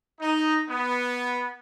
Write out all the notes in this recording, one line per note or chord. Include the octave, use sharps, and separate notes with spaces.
D#4
B3